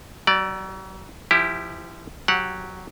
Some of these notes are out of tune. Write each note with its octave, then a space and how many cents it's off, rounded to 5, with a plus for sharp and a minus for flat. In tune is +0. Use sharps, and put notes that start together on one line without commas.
F#3 +40 D5 +0
F3 -25 E4 +0 G4 +0
F#3 +0 G4 +0 F#5 -15